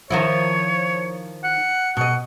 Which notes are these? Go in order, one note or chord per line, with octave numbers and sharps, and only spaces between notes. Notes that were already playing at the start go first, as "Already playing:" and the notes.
D#3 F3 E4 C#5
F#5
B2 D#5 F#5